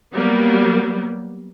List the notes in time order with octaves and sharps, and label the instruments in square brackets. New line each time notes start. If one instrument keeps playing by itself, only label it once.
[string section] F#3 G3 A#3 B3